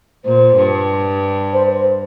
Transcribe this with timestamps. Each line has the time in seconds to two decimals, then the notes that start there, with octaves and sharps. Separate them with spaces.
0.25 A#2 C5
0.56 G2
1.53 C5
1.72 C5